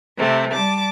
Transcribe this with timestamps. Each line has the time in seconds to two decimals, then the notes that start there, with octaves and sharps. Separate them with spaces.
0.17 C3 A3 C4
0.51 G3 A5 D6